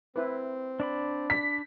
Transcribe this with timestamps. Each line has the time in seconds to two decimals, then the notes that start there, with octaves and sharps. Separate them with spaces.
0.16 C4 E4 B4
0.80 D4 D5 B5
1.30 B6